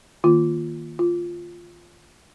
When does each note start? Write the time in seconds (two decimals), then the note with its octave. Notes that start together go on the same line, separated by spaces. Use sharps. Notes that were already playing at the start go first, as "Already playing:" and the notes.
0.24 D#3 A#3 F4
0.99 F4